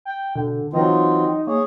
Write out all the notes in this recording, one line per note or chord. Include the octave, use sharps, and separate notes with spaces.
G5
B2 D3
E3 F#3 C4 D#4 F4
A#3 G#4 C#5